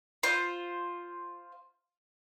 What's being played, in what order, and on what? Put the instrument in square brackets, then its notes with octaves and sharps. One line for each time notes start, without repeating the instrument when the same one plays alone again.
[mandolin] F4 C5